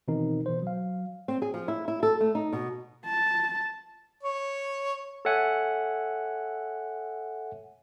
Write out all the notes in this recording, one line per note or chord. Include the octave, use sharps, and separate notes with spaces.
B2 D#3 E3 C4 D#4 A#4
B2 E3 C5
F#3 F5
C4
G#4
F3
E4
E4
A4
A3
D#4
B2
A5
C#5
A4 C#5 E5 F#5 G#5